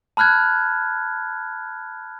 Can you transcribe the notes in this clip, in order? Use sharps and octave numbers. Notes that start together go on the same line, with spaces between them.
A5 B5 F6 F#6 G#6